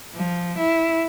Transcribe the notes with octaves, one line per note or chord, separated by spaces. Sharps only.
F3
E4